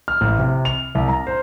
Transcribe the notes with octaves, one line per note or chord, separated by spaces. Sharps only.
F6
A1
C3
F7
C2
A#5
C5